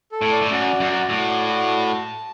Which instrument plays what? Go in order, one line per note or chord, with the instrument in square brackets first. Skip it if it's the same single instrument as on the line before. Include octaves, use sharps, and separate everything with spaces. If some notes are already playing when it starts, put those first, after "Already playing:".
[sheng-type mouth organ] A4
[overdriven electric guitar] A2
[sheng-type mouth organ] D5
[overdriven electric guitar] A2
[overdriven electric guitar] F#2 [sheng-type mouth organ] F#4
[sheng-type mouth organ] D5
[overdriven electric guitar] F#2
[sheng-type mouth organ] F#4
[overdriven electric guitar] A2 [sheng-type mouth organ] F#4
[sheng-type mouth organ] D5
F#4
A5
A5
A5